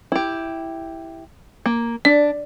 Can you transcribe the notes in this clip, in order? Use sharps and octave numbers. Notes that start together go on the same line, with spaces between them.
E4 G4
A#3
D4 D5